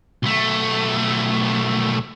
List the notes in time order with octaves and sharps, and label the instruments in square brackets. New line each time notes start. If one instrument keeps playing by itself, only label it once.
[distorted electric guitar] B1 A3